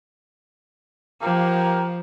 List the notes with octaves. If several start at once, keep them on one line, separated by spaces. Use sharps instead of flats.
F3 A#3 G4 A#4